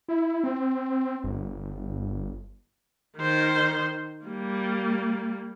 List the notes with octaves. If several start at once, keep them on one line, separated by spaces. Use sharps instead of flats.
E4
C4
G1
D#3 C5
G3 A#3